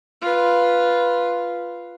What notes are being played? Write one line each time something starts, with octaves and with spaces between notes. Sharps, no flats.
F4 B4